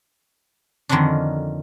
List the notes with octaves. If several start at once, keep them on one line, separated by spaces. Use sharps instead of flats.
F2 D3 D#3 A#3 C#4 D4